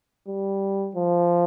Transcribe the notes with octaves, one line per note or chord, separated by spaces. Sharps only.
G3
F3